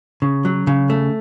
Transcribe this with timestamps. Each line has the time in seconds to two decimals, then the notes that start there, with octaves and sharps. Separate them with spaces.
0.22 C#3
0.45 F#3
0.67 C#3
0.90 A3